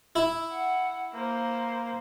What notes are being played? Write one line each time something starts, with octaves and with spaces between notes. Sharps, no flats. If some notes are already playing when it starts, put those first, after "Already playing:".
E4
F#5
A#3 C5